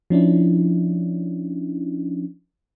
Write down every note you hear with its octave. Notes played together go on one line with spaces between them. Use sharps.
F3 C#4 D4 E4